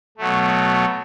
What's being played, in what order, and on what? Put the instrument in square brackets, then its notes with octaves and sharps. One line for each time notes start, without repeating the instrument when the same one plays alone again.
[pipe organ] B2 F#3 A3